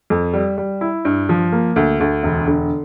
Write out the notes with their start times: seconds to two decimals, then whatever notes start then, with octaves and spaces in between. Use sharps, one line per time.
0.10 F2
0.33 G3
0.58 G3
0.81 E4
1.05 G2
1.29 F3
1.52 A#3
1.76 D2
2.00 D2
2.23 E1
2.47 D3